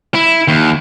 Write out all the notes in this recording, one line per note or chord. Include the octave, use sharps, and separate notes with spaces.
E4
D#2